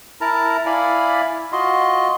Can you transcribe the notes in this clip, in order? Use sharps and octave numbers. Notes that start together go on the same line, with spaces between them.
E4 A#4 A5 A#5
E4 D5 F5 G#5 B5
F4 F#4 D#5 C6